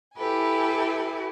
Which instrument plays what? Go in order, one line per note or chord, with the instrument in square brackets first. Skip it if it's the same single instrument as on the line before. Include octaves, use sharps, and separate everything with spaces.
[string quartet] E4 G4 A4 B4 G#5